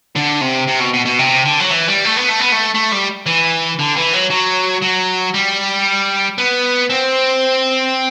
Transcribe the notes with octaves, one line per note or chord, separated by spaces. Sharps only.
D3
C3
C3
B2
B2
B2
C3
D3
F#3
E3
G3
A3
B3
A3
B3
A3
A3
G3
E3
D3
E3
F#3
F#3
F#3
G3
B3
C4